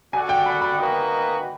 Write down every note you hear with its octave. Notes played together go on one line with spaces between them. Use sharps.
F#4 A4 D5 F#5 G#5
G5
B5
B5
A#3 D#4 F#4 B4 D#5